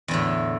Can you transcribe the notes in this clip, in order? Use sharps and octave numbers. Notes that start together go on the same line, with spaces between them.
E2 A2 D3